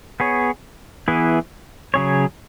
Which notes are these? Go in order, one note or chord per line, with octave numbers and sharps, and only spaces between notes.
B3 G#4 C#5
E3 B3 E4 G#4
C#3 F#3 C#4 G#4 C#5